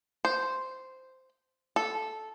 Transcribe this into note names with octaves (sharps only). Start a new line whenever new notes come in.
C5
A4